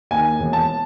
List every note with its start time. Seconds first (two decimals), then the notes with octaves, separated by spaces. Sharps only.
0.11 D#2 G#5
0.39 E1
0.53 A5